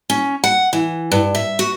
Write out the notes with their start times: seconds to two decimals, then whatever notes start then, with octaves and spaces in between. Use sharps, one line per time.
0.10 C#4
0.44 F#5
0.73 E3
1.12 G2
1.35 E5
1.59 F#4